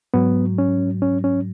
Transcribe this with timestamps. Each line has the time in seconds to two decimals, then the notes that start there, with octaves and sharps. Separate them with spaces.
0.14 G#2 F#3 B3
0.58 C#4
1.02 C#4
1.24 C#4